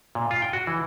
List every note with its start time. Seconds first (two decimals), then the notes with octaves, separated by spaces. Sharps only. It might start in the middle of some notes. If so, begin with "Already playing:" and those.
0.15 A#2
0.31 F4
0.42 G5
0.53 F#4
0.67 E3